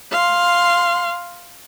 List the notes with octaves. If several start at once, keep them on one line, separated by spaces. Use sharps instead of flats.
F5 C6